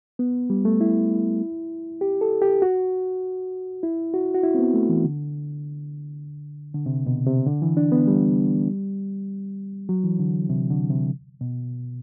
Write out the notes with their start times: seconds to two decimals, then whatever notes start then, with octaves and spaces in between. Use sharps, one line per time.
0.19 B3
0.50 G3
0.65 A3
0.81 E4
2.01 G4
2.21 A4
2.42 G4
2.62 F#4
3.83 E4
4.14 F#4
4.34 F#4
4.43 E4
4.54 C4
4.59 B3
4.74 A3
4.89 E3
5.04 D3
6.75 D3
6.86 C3
7.06 B2
7.26 C3
7.46 D3
7.62 E3
7.77 D4
7.92 B3
8.07 G3
9.89 F#3
10.04 E3
10.19 D3
10.50 C3
10.70 D3
10.90 C3
11.41 B2